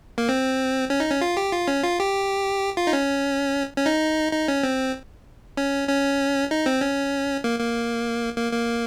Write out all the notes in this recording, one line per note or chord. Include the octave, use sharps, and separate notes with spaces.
A#3
C4
C#4
D#4
C#4
F4
G4
F4
C#4
F4
G4
F4
D#4
C#4
C#4
D#4
D#4
C#4
C4
C#4
C#4
D#4
C4
C#4
A#3
A#3
A#3
A#3